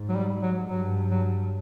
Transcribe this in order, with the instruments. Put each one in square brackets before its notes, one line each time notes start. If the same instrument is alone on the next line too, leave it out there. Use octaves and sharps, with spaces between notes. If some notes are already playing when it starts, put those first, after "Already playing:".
Already playing: [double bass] G#2
[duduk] F#3
G3
F#3
[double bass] G2 [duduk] F#3
[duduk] F#3